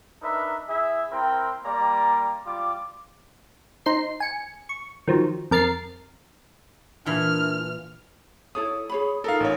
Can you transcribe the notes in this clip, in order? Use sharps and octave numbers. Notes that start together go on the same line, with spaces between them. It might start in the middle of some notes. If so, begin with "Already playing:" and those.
D4 D#4 A#4 B4 E5
E4 G#4 E5
C4 E4 A#4 G5 C6
G3 A#3 D5 A#5 C6
G3 F4 D6
D#4 C5 C7
G#5 C#7
C#6
D#3 F3 F#3
F2 A#4 A6 C7
A#2 E3 D4 F6
E4 A4 C#5 D#6
G#4 C#5 B5
D#4 F4 A4 A#4 F5
A1 C#5